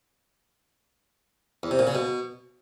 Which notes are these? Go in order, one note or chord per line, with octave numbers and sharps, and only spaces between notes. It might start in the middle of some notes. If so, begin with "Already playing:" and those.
E2
C3
A#2
C#3
B2